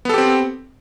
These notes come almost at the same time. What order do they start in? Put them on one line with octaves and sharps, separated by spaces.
B3 A4 G4 C4